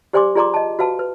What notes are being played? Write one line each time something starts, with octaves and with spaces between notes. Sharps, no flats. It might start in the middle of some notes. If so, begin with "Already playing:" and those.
G4 C5 D5 G#5 C6 D6
F4 G#4 D5 A#5 C6 D6
D#5 A5
F#4 B4 F5 A5
B4